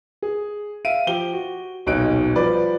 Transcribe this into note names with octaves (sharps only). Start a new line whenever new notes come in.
G#4
E5 F5 D7 D#7
F3 G4 G7
F#4
D#1 B1 D#4 F#6 D7
F3 G3 B4 D5